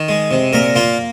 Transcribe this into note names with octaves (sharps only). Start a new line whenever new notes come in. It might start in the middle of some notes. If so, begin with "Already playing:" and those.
Already playing: D#3
G#3
C3
A#2 A#4
A#3 F4